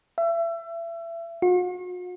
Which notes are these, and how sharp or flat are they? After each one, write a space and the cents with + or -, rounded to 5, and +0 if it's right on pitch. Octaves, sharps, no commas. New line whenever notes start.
E5 +30
F#4 -45